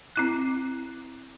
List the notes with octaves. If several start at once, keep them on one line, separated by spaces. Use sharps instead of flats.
C4 E4 F#6